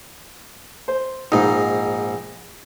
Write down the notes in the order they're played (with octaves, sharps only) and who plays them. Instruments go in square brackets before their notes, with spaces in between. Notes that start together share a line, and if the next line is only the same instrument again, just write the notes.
[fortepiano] C5
[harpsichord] A#1 G#2 [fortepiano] D#4